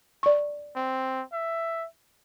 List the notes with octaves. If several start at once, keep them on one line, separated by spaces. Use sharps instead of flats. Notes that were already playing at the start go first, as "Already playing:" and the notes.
D5 C#6
C4
E5